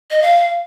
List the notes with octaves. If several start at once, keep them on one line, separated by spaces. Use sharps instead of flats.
D#5
F5